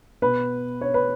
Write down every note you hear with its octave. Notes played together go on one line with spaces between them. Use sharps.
B2 B3 B4
C#5
B4